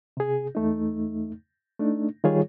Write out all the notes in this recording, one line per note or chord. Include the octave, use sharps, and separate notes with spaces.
C3 G#4
E2 A3 D#4
A3 D4 D#4
D#3 G3 F4 G#4 C#5